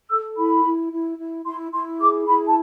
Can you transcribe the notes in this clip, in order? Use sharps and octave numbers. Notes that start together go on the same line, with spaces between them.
A4 E6
E4 B5
E4
E4
E4
E4 C6
E4 C6
G#4 D6
E4 B5
A5